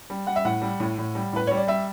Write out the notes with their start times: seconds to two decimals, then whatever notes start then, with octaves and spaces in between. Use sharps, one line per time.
0.10 G3
0.27 G3 F#5
0.36 E5
0.45 A2 F#5
0.62 G3
0.80 A2
0.98 A2
1.15 G3
1.33 A2 B4
1.47 G3 C#5
1.57 D5
1.68 G3 E5